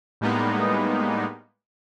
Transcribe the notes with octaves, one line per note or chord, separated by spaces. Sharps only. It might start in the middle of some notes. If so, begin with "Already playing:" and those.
A2 G3 G#3 A#3 B3 D#4